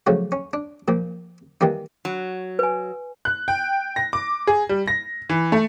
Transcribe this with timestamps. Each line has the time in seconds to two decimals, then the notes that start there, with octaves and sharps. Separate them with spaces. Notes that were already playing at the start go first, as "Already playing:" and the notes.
0.07 C#3 F3 F#3 A3
0.32 C#4
0.53 D4
0.88 A#2 F3 A#3
1.61 D#3 E3 G3 A#3 D#4
2.05 F#3
2.59 B4 G#5
3.25 F#6
3.48 G5
3.96 A#6
4.13 D6
4.47 G#4
4.69 G3
4.88 A#6
5.30 E3
5.52 A3